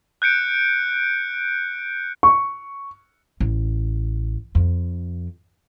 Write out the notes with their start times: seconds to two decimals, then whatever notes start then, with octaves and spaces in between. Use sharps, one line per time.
0.22 F#6 G6 C#7 D7
2.23 C#6
3.40 A1
4.55 F2